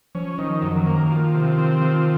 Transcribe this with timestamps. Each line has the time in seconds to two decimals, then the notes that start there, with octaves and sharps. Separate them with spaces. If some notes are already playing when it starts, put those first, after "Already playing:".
0.15 F3 C#4
0.38 D#3 F3
0.62 F#2
0.75 D#3
0.87 A#3
1.10 F3
1.34 C3
1.58 C4
1.82 F3